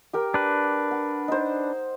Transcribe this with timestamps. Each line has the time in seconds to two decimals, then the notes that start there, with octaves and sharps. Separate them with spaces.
0.13 G4 A#4 G5
0.34 D4 B4
0.91 F#5
1.28 D#4 C5